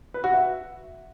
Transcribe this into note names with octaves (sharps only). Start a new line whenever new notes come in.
B4
F#4
E5